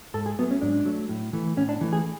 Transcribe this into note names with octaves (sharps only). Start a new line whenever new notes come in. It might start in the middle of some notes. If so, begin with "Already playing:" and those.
G#2 A4
G#4
F#3 A3 B3
C#4
G#2 D4
F#3 A3
A2
E3 A3
A2 C#4
D4
E3 A3
G#4